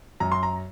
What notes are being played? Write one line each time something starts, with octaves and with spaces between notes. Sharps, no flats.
F#2 A#5
C6
A#5